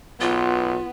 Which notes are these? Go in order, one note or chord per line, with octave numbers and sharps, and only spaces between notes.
B1 B3 F4